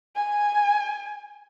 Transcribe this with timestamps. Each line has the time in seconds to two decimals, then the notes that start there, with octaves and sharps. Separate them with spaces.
0.16 G#5